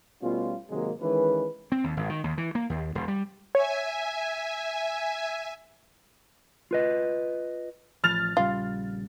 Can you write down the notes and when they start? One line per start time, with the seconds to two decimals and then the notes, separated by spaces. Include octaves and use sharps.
0.22 B2 G3 A3 C#4 F4
0.70 G#1 C3 D#3 F#3 G#3 A#3
1.01 D#3 E3 G#3 C#4 B4
1.72 C4
1.84 D#2
1.97 G#1
2.09 D#3
2.24 D#2
2.38 E3
2.55 A#3
2.70 D#2
2.95 E1
3.08 G3
3.55 C#5 E5 G#5
6.71 F4 B4 D#5
8.04 A1 F3 F6 A6 F7
8.37 A#1 C#3 G3 F4